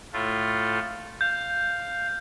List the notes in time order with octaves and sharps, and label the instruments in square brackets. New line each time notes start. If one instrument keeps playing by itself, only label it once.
[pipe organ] A2 A3 F4
[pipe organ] F5 [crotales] G6